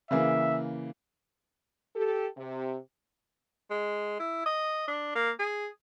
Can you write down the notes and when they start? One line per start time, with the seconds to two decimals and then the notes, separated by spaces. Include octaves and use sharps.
0.11 C#3 E3 A#3 E5
1.96 G4 A4
2.37 C3
3.71 G#3
4.20 E4
4.46 D#5
4.88 D4
5.15 A#3
5.39 G#4